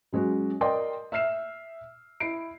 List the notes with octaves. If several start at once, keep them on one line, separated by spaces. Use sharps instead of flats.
F#3 G#3 C#4 F#4
A#4 D5 D#5 G5 C6
E5 E6 F6 C7 E7
E4 C7 D7